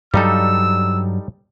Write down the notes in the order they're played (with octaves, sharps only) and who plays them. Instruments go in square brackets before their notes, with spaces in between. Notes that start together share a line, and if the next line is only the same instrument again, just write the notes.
[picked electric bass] G2 F#3 [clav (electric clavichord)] G3 D#4 A4 [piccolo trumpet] E6